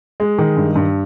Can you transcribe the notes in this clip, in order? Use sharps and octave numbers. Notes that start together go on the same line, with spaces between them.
G#3
D#3
G2
G2